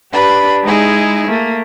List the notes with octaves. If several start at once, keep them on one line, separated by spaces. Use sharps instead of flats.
D4 G4 B4 B5
G#3 D#4 E4 G#4
A3 A#3